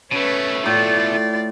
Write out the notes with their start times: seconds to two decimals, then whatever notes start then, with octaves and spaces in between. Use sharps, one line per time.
0.11 B2 A3 C#4 B4
0.66 A2 F4 D5